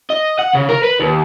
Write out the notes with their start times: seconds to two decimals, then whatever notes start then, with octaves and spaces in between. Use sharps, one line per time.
0.10 D#5
0.39 F#5
0.54 C#3
0.69 A#4
0.83 B4
1.00 D#2